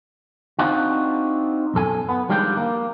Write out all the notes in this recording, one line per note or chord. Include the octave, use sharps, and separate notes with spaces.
C4 D4 D#4 F4 F#4
B1 F#2 A4 G#5
B3
D#3 F3 G3 G#3 D4 G4
A#3